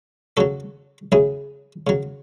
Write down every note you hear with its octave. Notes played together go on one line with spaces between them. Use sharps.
C#3 F#3 F#4 A4
C#3 F#3 E4 G#4
C#3 F#3